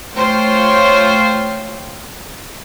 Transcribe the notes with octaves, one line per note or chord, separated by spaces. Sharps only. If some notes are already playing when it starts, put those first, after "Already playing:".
A3 F4 C5 C#5 G5